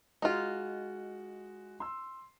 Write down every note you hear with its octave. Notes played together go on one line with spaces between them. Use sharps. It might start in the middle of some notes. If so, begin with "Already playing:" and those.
G#3 D#4 F4 F#4
C6 E6